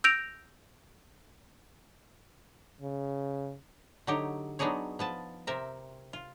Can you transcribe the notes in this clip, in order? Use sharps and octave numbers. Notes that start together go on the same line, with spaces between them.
E6 G6 A#6 D7 F7
C#3
D3 F#3 D#4 G4 C#5
F#3 B3 D4 D#4 G#4 C#5
F3 B3 A5
C3 C4 A#4 E5
F4